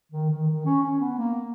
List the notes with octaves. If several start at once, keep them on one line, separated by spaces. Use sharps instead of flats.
D#3
D#3
D#3
C#4
C#4
B3
A#3